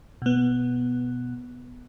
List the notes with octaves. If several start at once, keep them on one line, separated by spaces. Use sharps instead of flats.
B2 B3